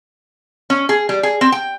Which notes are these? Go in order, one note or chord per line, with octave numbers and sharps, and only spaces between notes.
C#4
G#4
G3
G#4
C4
G5